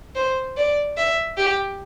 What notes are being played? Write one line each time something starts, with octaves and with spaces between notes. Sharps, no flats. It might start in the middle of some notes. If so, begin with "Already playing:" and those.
C5
D5
E5
G4